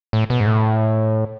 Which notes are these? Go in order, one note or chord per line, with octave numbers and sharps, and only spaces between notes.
A2
B2
G#2
A2